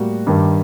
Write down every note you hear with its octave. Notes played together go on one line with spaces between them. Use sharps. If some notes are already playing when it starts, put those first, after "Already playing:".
Already playing: A2 G3 A#3 F#4
G2 D#3 G3